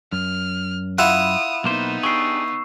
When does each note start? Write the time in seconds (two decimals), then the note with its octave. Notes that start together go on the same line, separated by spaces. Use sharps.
0.13 F#2 F6
0.98 E4 F4 F#5 B5 D#6 E7 F7
1.64 B1 A#3 B3 D#4 C5
2.03 D4 G4 G#4 C#6 E6 C7